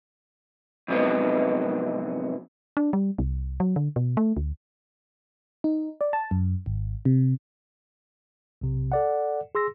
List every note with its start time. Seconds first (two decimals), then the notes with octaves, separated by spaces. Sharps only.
0.88 F2 G#2 C3 F#3 B3 D#4
2.77 D4
2.93 G3
3.19 C2
3.60 F#3
3.76 D3
3.96 B2
4.17 A3
4.37 D2
5.64 D#4
6.01 D5
6.13 A5
6.31 F#2
6.66 G#1
7.05 C3
8.61 B1 C3
8.92 A4 D5 F#5
9.55 G#4 C6 E6 A#6